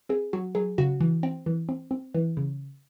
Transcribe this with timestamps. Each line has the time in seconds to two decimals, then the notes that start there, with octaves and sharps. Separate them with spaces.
0.09 C4 G#4
0.33 F#3 F#4
0.55 F#3 G#4
0.78 C#3 F#4
1.01 E3
1.23 C4
1.46 E3
1.69 C4
1.91 C4
2.14 E3
2.37 C#3